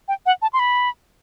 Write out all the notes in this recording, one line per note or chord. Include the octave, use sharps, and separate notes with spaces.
G5
F#5
A5
C6
B5